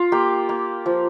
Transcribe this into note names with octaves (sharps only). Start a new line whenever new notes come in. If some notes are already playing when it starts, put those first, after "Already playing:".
Already playing: F4
A#3 G4
A#3
F3